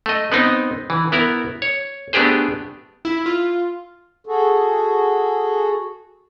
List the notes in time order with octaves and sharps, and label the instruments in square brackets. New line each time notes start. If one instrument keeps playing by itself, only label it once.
[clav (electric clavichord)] A3 D#5
B3 C4 D#4
E3
B3 E4 A#4
C#5
A3 B3 D4 G4 G#4 C5
[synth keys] E4
F4
[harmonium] F#4 G#4 A4